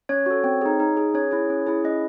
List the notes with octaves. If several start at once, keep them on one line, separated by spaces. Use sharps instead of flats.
C#4 C#5
F#4 A4
C4
D#4 G#4
D#4
G#4
C#4 C#5
E4 G#4
C#4
E4 G#4
C#4 D#5